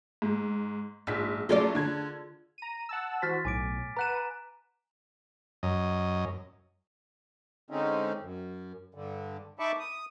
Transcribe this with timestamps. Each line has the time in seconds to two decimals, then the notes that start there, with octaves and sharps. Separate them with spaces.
0.22 G#2
1.07 A#1 G#2 B6
1.49 F#3 A3 C#4 F4 G#4 D5
1.75 D3 G#6
2.58 A#5 D#7
2.89 F#5 A5 E6
3.22 E3 F#4 C5 F6 A6 B6
3.45 B1 A2 G#5 D6 D7
3.97 B4 F#5 A#5 F#6 D#7 E7
5.63 F#2 D#5
7.71 D3 G#3 C4 C#4 D#4
8.21 F#2
8.95 G2 D3
9.59 D#4 E5 A5 B5 C#6 D6
9.79 D#6